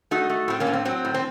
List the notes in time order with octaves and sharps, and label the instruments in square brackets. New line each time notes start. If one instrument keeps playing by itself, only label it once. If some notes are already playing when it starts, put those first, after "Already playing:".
[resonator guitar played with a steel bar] A3 D#4 F#4
A3
A2 C4
A#3 C#4
A2
C4
F#3 C4
A2
C4